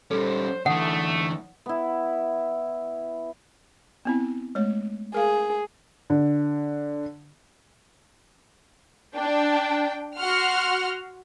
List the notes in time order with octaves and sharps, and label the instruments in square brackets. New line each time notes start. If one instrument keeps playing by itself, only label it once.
[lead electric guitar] G3 C#4 [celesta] A4 [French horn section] C5
[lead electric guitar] D3 E3 [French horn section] A3 [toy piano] F#5 [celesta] D#6
[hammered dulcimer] B3 E4
[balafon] B3 C4 E4
G#3 A3 C#5
[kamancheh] G#4 [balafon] A#4 F5
[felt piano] D3
[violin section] D4 G5
F#4 F#5 C6 F6